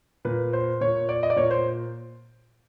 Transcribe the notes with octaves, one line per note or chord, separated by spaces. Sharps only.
A#2 B4
C5
A#2 C#5
D5
D#5
D5
A#2 C#5
C5